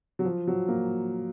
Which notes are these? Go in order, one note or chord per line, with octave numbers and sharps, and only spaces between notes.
F#3
F3
F#3
A#3